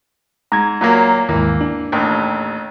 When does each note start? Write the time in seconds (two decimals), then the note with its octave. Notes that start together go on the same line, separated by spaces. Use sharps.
0.52 G#2 A#5 G#6
0.81 A#2 F#3 A#3
1.29 D#2 G#2 E3 A#3
1.61 D4
1.92 A1 D#2